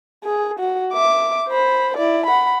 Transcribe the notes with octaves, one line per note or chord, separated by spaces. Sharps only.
G#4
F#4
E5 D6
C5 B5
E4 D5
F#5 B5